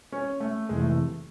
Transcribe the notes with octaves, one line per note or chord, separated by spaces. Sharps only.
C#4
A3
F2 C3 E3 G#3
A3